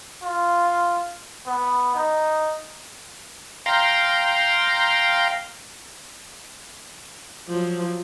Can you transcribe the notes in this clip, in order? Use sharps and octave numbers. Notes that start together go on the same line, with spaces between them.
F4
B3
D#4
F5 G5 A#5 C6
F3 F#3